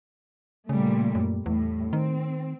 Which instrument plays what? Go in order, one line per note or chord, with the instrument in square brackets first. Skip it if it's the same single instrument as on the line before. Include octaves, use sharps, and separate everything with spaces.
[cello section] A#2 G3 A3 [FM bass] C#3
[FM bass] F#2
[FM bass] E2 [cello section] A2 G3
[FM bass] D#3 [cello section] C4